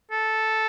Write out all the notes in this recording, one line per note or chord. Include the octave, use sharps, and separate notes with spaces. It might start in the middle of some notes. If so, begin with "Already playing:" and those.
A4